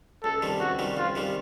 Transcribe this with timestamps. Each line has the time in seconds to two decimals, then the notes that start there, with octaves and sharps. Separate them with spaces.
0.24 C#2 A4
0.42 C3 D#3 G3
0.60 C#2 F#4
0.79 C3 D#3 G3
0.97 C#2 F4
1.15 C3 D#3 G3